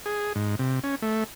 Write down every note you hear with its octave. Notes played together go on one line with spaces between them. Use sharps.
G#4
G#2
C3
C#4
A3